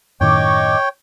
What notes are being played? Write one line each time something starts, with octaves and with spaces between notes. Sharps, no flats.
F#2 A2 D#3 C#5 D#5 G5 C#6 D6